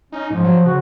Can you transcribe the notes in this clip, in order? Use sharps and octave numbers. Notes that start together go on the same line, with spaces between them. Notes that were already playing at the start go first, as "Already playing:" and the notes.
C#4 D#4
G#2 F3
F#3
C#3 F#4